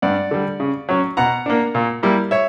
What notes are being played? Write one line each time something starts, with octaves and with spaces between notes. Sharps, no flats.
G2 D5 F#5
D3 G3
C#3
F#3 C#4
B2 F#5 A#5
A#3 D4
A#2
G3 A#3 E4
C#5 E5